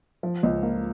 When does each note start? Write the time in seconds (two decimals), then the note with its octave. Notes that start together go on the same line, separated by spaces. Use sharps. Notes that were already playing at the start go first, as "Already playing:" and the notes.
0.23 F3
0.43 C#2
0.63 A#3